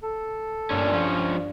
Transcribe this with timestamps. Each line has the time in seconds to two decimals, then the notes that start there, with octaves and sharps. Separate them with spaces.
0.03 A4
0.70 G2 A#2 D3 C#4
0.93 F3 C#4